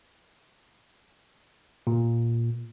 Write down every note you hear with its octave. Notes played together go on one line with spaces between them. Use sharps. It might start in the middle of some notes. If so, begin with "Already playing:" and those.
A#2